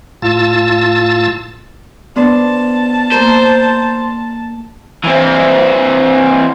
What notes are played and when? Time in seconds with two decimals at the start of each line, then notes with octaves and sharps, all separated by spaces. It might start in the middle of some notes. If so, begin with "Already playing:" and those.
0.22 A2 F4 A5 E6 A6
2.16 B3 D4 C5 A5
3.12 A#3 A#4 C5
5.04 E3 C4